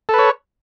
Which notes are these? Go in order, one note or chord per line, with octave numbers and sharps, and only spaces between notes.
A4 B4 C#5